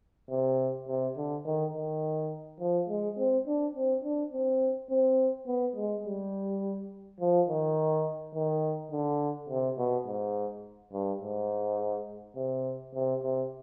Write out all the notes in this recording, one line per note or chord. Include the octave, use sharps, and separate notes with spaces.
C3
C3
D3
D#3
D#3
F3
G#3
C4
D4
C4
D4
C4
C4
B3
G#3
G3
F3
D#3
D#3
D3
C3
B2
G#2
G2
G#2
C3
C3
C3